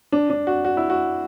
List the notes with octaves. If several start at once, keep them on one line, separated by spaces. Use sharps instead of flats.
D4
D4
F#4
F#4
E4
F#4